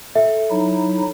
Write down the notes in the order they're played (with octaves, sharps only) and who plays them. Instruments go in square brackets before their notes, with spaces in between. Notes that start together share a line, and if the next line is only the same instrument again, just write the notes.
[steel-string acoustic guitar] A4 [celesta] E5
[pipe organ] F#3 D#4 E4